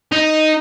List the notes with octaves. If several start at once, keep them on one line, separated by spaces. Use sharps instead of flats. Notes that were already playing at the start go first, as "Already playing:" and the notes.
D#4